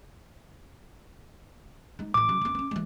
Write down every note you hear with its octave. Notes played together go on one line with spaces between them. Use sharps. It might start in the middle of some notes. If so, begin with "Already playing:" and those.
G#3 D#4
A2 E3 D6
C#3 F#3
F#1 B3
B3 C#4
E3 G#3